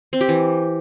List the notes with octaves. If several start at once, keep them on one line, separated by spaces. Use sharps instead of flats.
C4
G4
E3